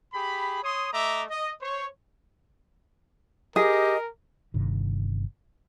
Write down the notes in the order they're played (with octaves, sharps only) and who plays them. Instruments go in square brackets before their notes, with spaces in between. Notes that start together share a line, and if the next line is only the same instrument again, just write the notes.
[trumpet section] G4 G#4 B5
C#5 C6 D#6
A3 D#5 E5 A#5 D6
D#5
C5 C#5
[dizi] G4 [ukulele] G#4 [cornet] A#4 [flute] D#5
[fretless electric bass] G1 G2 C3 D#3